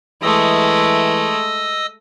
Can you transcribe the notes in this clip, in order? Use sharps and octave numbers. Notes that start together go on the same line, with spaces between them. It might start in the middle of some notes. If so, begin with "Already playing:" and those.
E3 G#3 A3 D#5 D#6 E6